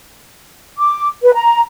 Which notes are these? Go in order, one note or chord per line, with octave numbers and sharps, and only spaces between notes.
D6
B4
A#5